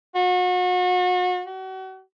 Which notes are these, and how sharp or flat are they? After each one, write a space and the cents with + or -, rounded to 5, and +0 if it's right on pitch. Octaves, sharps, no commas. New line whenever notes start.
F#4 -35
F#4 +35